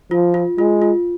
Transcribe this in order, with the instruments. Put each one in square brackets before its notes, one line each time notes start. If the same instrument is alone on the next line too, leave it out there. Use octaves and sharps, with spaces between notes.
[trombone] F3 [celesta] F4
[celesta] F4
[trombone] G#3 [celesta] F4
[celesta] F4